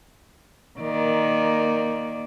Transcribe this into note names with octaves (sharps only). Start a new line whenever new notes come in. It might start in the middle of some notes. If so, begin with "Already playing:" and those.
D#3 A#3 D5